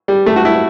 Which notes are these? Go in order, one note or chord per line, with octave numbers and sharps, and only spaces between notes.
G3
A3
F#4
E4